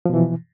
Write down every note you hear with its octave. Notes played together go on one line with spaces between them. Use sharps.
B2 E3 F3